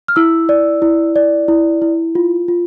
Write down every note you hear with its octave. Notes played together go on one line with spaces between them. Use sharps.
F6
E4 E6
D5
E4
D5
E4
E4
F4
F4